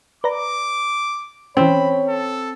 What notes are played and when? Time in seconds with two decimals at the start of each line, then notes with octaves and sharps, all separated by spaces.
0.24 B4 D5 A#5 D6
1.57 E3 C4 C#4 C#5 B5
2.08 A4